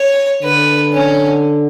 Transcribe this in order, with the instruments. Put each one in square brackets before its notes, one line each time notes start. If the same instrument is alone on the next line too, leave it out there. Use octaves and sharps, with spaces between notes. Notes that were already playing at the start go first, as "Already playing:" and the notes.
Already playing: [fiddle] C#5
[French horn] D3 [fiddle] B4
[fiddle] C#4